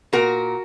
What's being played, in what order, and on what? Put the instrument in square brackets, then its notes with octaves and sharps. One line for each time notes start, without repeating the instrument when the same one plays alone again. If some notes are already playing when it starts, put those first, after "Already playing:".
[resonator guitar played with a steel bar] A#2 F#4 A#4